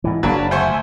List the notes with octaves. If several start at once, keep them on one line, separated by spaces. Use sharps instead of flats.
G#2 E3
F#1 F#3 A#3 D4 A#4 A5 B5
D2 C5 E5 G#5 C#6